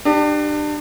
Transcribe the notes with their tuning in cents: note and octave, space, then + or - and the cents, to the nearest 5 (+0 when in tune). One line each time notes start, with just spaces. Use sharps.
D4 +30 G4 +0